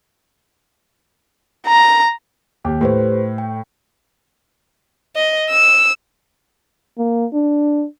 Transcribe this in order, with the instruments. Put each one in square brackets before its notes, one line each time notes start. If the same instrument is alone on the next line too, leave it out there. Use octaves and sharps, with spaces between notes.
[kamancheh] A#5
[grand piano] D#2 G4
[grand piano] A2 [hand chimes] G4 B4 C5
[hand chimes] G5
[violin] D#5
E6
[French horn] A#3
D4